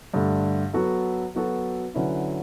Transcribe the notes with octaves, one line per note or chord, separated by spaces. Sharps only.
G2 D3 A3
F#3 B3 F#4 A4
F#3 B3 F#4 A4
D3 F#3 C#4 E4 B4